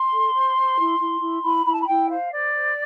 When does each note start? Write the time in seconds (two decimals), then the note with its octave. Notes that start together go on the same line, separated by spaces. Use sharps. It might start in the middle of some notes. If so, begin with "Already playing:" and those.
Already playing: C6
0.11 A4
0.33 C5
0.55 C5
0.78 E4
0.99 E4
1.21 E4
1.43 E4 B5
1.65 E4 B5
1.72 A5
1.80 B5
1.87 E4 G5
2.09 C5 F5
2.32 C5 D5
2.54 C5